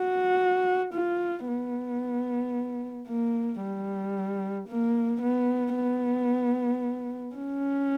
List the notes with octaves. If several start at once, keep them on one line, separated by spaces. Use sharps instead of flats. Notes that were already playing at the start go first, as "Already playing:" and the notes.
Already playing: F#4
F4
B3
A#3
G3
A#3
B3
B3
C#4